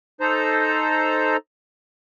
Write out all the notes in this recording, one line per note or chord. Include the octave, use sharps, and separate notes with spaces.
D#4 A4 C5 A#5